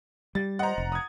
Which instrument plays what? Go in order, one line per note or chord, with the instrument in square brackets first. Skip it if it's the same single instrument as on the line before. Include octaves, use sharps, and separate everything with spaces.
[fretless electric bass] G3 [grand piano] A6
[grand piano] C5 D#5 [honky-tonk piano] F#5 A#5
[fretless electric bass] F1
[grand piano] D#6 G#6